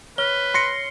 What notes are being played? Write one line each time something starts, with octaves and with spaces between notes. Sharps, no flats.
B4 C#5 F6 G7
C6 A#6 C7 C#7